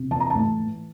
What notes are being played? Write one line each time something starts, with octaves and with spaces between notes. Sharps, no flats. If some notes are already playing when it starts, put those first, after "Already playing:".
Already playing: C3
E3 A5
A#5
A2 A5
E3